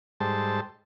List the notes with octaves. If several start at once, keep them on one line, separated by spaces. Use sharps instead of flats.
G#2 G3 A4 C5 A5